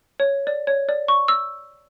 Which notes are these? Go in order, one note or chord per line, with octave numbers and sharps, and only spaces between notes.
C#5
D5
C#5
D5
C#6
E6